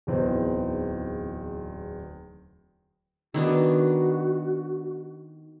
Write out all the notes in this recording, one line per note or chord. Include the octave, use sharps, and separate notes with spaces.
D1 E2 C4 D#4
D#3 B3 D4 F#4